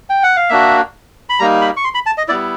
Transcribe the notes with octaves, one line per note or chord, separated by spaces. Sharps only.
G5
F#5
F5
A#3 D4 F#4 E5
B5
G3 A#3 D#4 A#5
B5
C#6
C6
B5
A5
D#5
G3 B3 E4 D5